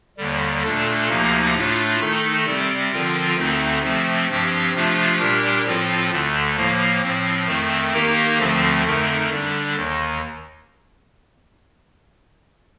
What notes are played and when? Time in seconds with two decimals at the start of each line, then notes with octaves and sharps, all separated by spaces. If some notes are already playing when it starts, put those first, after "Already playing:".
0.17 D#2 D3 G3
0.63 A#2 A3 D4 A4
1.09 D2 C3 F3 A#3 D#4
1.54 A2 A3 D4 F4
2.00 D#3 A3 D#4 A4
2.46 C3 G3 C4
2.92 D3 F3 C4 F4 A#4
3.37 D2 D3 A3 C4 D#4
3.83 C3 F3 A3 C4
4.28 G2 F3 C4 G4
4.74 C3 F3 A3 D4 F4
5.19 A#2 G3 D4 G4 A#4
5.65 A2 F3 C4 F4 A4
6.11 D2 D3 A3
6.56 A2 F3 A#3
7.02 A2 F3 C4
7.47 F2 D#3 A3 C4
7.93 D#3 A#3 D#4 G4 A#4
8.39 D2 D3 F3 A3 C4
8.84 F2 D3 A3 D#4 A#4
9.30 D3 G3 D4
9.76 D#2 D#3